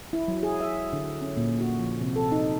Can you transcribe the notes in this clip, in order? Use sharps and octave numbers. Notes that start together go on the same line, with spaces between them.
E4
F#3
G#4
E5
D3
C#4
A#2
F#4
F3
C3
A4
D#4